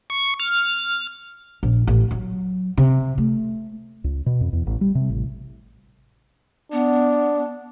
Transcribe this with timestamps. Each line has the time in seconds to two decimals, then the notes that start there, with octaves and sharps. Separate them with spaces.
0.10 C#6
0.40 F6
1.63 A#1
1.88 A1
2.11 F#3
2.77 C3
3.18 A3
4.04 C#2
4.26 B2
4.41 F2
4.53 E2
4.67 A1
4.81 G3
4.95 C3
5.10 A1
6.72 B3 D4